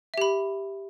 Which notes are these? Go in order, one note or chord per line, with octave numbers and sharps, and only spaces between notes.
G4 E5 B5